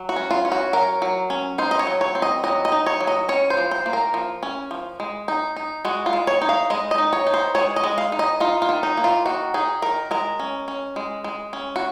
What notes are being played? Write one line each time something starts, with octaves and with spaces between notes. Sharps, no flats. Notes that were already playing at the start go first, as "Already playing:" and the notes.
Already playing: F#3
F#4
C#4
F4
C#4
F#4
F#3 A#4
F#3
C#4
D#4 C5
D#5
C#5
F#3
C#5
C4
D#5
F#3 D#5
D#5
D#4
C#5
F#3
D#5
C#4 C#5
C5
F3
C5
A#3
A#4
F3
C#4
F3
G#3
D#4
D#4
G#3 F#4
F4
G#3
C#5
D#4
F5
G#3 D#5
D#5
D#4
C#5
D#4
C5
G#3 C#5
D#5
G#3
F5
D#4
D#5
D#4 F4
F4
D#3
D#4
A#3
F4
D#3 F#4
D#4 G#4
D#3 A#4
G#3 A#4
C#4
C#4
G#3
G#3
C#4
F#4